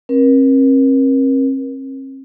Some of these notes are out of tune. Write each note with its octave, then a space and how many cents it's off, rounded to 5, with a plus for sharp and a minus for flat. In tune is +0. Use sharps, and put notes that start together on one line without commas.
C4 +45 A#4 +35